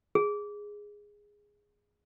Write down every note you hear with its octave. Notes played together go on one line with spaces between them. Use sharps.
G#4